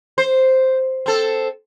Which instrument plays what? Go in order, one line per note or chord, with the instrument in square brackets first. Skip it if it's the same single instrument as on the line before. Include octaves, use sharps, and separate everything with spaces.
[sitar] C5
C4 A4